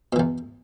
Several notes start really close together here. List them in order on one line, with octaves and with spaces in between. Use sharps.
B2 E3 E2